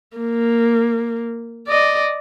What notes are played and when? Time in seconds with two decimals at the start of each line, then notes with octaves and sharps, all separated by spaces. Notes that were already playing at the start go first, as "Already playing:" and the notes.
0.17 A#3
1.68 D5 D#5